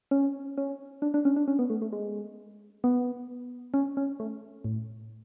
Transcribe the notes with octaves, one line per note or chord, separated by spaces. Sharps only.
C#4
C#4
D4
D4
C#4
D4
C#4
B3
A3
A3
G#3
B3
C#4
C#4
A3
A2